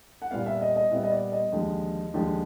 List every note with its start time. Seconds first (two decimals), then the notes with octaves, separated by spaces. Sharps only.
0.22 F#5
0.31 A#2 G3 B3 F5
0.46 E5
0.61 D#5
0.76 D#5
0.91 A#2 G3 B3 E5
1.03 D#5
1.12 D5
1.32 D#5
1.52 D#2 D3 F3 G#3
2.14 D#2 D3 F3 G#3